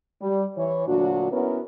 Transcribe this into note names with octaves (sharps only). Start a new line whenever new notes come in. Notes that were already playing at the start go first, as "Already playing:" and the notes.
G3
E3 C#5
D2 A#2 F#3 D4 F#4
B3 C#4 E4 F#4 A#4 B4